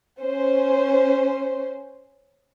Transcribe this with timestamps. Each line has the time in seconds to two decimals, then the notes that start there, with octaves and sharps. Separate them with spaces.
0.21 C#4 C5